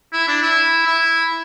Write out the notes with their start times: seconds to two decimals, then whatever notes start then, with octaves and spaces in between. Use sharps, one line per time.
0.13 E4
0.28 D4
0.42 E4
0.86 E4